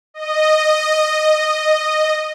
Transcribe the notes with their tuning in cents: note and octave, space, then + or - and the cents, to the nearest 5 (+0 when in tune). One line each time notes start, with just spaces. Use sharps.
D#5 -10